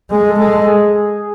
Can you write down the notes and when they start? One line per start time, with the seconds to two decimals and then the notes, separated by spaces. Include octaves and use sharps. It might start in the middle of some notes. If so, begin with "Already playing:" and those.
0.11 G#3 G#4
0.29 A4
0.39 G#3
0.49 A4
0.67 G#4